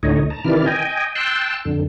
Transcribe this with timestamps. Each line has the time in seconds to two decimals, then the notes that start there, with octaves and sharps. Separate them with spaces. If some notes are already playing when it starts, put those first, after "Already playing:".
0.03 D2 A2 D3 D#4 C#5 D#5
0.30 A5 A#5
0.45 C3 D#3 E3 E4 D5 F6
0.66 D#5 G5 G#5
1.15 G5 A5 C6 E6 F#6
1.65 F2 D3